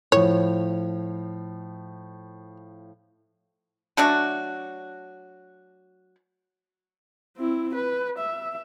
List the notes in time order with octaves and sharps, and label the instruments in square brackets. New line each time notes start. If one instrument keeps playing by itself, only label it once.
[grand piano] A2 F3 [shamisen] C#5
[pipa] F#3 A3 D4 F#4
[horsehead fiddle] C4 E4
B4
E5